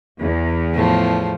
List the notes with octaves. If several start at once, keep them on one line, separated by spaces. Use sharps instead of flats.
E2
A2 F3